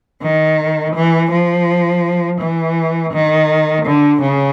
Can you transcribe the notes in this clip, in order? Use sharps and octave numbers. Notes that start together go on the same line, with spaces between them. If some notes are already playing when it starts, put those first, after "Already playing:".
D#3
E3
F3
E3
D#3
D3
C#3